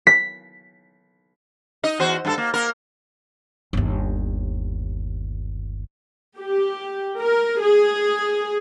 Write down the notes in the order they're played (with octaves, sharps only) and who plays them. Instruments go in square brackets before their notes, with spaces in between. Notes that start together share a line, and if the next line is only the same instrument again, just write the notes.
[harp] B6
[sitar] D#4 D#5
E2 F#4 C5
G2 B3 A4
A#3
A#3 A#4
[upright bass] G1 D#2
[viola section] G4
A#4
G#4